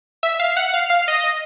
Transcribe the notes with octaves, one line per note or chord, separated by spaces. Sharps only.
E5
F5
F#5
F5
F5
D#5